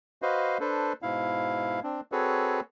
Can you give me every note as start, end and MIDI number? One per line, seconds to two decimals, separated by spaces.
0.22 0.58 66
0.22 0.58 71
0.22 0.58 72
0.22 0.58 75
0.22 0.58 77
0.60 0.93 62
0.60 0.93 69
0.60 0.93 71
0.60 0.93 72
1.02 1.80 44
1.02 1.80 47
1.02 1.80 64
1.02 1.80 77
1.83 2.01 60
1.83 2.01 62
2.12 2.60 60
2.12 2.60 66
2.12 2.60 68
2.12 2.60 69
2.12 2.60 71
2.12 2.60 73